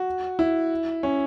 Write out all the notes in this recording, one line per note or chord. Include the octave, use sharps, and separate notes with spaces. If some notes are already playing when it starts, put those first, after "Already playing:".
Already playing: F#4
E4
C#4